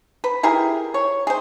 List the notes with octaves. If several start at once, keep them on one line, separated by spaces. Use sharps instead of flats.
B4
E4 G4 G#4 A#4
C#5
G#4 C5